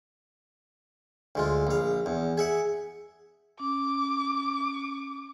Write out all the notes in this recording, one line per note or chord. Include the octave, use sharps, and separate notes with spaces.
D2 G#3 F4
A#1 F5
E2
G#4 E5 F#5
C#4 D6